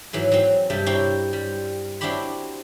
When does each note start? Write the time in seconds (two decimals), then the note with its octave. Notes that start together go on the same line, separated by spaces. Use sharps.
0.13 G#2 E3 F#3
0.32 F#3 C4
0.70 G2 C3 G3 E5 G5 A5
0.86 C4 D4 E4 C#5 G5 A#5
1.33 G3
2.01 C4 D4 E4 F#4 G4 B5